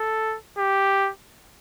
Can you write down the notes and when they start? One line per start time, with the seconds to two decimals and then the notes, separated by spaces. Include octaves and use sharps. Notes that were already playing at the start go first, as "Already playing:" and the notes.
Already playing: A4
0.58 G4